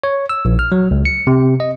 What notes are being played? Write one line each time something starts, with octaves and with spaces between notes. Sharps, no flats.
C#5
E6
A#1
F6
F#3
C#2
C#7
C3
D#5